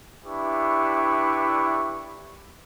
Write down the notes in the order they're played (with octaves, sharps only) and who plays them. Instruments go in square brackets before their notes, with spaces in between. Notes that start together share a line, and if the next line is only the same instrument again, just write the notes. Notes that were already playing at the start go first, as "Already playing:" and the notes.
[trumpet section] D4 E4 G4 B4 E5 C#6